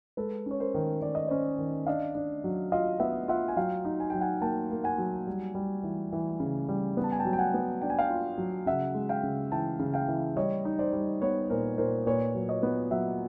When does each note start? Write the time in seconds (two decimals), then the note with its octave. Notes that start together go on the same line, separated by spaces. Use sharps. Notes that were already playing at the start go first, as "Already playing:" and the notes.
0.17 G#3 A4 B4
0.46 C#4 C#5
0.60 A#4 C5
0.74 D#3
1.02 D#3 D5
1.15 D#5
1.28 C#4 C5 D5
1.58 D#3
1.87 D4 D#5 F5
2.15 D4
2.44 F#3
2.72 F4 D#5 F5
3.00 B3 E5 F#5
3.28 F4 E5 F#5
3.48 G#5
3.57 F#3 F5 G5
3.85 D#4
4.00 G#5
4.10 F#3 G5
4.21 F#5 G#5
4.41 A#3 G5 A5
4.71 A#3
4.84 F#5 G#5
4.98 F#3
5.27 G3
5.55 G3
5.83 E3
6.12 E3
6.40 C#3
6.68 G3
6.97 B3
7.04 A5
7.12 G#5
7.19 G5 A5
7.25 F#3
7.33 G5
7.39 F#5 G#5
7.54 B3
7.82 D4 G5
7.90 G#5
7.99 F5 G5
8.10 F4
8.38 F#3
8.66 C#3 E5 F#5
8.94 G#3
9.09 F5 G5
9.23 C#3
9.52 E3 G5 A5
9.79 C#3
9.94 F5 G5
10.08 E3
10.36 G3 C#5 D#5
10.65 D#4
10.79 C5 D5
10.93 G3
11.22 B3 B4 C#5
11.50 A#2 A#4 C5
11.78 A#2 A#4 C5
12.06 A#2 B4 C#5
12.35 F#3
12.49 C#5 D#5
12.63 B3
12.91 F#3 E5 F#5